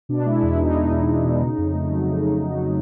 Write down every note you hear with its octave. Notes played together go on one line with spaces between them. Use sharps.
B2 D4
G#3 E4
E2 E4
E2 D#4
E2 D#4
E2
G#3
B2
C#3
F2
A3
F#3
C#3
C#3
F#3
F#3